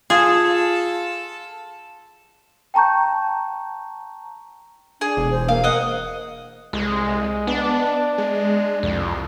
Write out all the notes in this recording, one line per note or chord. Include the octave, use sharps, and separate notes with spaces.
F4 G#4 A4
G5 A5 A#5 C#6 G6
D4 G#4
E1
C5
A#3 F5
A#4 D#5 F#5
C2 G#3
B3 D4
G#3
C2 F2